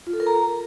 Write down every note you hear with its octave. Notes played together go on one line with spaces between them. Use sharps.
F4
A4
A#4
A#5